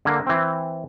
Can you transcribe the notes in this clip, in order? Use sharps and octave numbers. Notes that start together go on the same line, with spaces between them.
D3 A#3
E3 C4